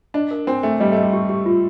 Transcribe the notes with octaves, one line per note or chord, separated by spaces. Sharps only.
D4 D#5
A#4
C4 D4
A3 D4
G3 D#5
A3 D#5
G3
G4
G4
F4